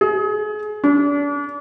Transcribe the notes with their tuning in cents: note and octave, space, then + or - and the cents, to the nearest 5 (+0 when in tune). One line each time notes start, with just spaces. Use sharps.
G#4 +30
D4 -35